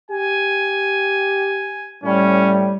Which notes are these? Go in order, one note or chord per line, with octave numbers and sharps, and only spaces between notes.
G4 G#5
A2 G3 C#4